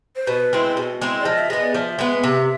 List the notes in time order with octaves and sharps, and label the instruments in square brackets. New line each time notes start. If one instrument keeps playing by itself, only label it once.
[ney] C5
[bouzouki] B2 [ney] B4
[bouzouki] G#3 C4 E4
B2
G#3 C4 E4
[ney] D5
[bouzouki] F3 [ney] D#5
[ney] E5
[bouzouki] G#3 B3 [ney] D#5
[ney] D5
[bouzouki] F3 [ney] E5
[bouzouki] G#3 B3
C3